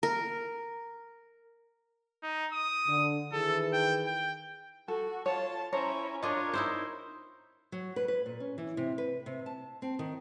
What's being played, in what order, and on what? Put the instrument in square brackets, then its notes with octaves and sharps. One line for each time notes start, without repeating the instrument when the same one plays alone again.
[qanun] A#4
[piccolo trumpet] D#4
D#6
[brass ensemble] D3
[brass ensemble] D#3 E3 G#4 [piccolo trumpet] A4
[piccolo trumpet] G5
G5
[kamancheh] F#4 [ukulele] A4
[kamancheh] F4 A5 [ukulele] C#5
[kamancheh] C#4 E4 [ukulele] C5 C#5 [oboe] A#5
[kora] D4 F4 [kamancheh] A#4 [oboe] C#5 [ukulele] D#5
[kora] D#4 E4 C5
[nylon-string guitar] F#3
B4
B4
A#2
C#4
E3
C3
B4
C3
A5
C4
D#3